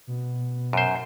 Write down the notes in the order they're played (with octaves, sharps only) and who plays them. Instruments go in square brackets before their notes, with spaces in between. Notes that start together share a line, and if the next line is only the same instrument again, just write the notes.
[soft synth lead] B2
[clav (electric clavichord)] F#2 C5